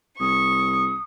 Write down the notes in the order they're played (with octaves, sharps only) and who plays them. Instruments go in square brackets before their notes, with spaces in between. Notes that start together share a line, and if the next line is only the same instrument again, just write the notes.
[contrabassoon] C2 [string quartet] C#6 [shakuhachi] D#6